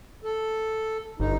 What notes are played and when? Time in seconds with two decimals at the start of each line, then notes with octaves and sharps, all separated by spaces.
0.24 A4
1.20 G1 D#4